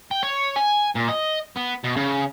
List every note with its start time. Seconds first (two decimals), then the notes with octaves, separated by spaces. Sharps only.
0.11 G5
0.23 C#5
0.56 G#5
0.96 A#2
1.09 D#5
1.57 B3
1.84 B2
1.97 C#3